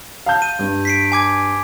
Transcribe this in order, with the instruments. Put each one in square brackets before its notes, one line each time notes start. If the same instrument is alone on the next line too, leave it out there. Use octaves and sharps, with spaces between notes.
[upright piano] F5 A5 G6
[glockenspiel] D#7
[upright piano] G2
[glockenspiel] B6 C7 D7
G#5 D6 G#6